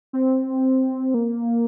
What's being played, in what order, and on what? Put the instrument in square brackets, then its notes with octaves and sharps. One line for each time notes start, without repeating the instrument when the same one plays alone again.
[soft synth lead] C4
A#3